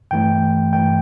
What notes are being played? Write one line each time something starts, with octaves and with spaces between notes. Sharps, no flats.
G2 E3 A3 G5
G2 E3 A3 G5